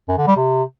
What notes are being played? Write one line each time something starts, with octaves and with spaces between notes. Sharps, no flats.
F#2
D3
G3
C3